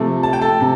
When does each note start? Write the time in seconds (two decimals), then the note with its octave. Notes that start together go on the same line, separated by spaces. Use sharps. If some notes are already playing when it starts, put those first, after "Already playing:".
Already playing: C3 F3 A3
0.23 A5
0.33 G5
0.41 A4 A5
0.60 C3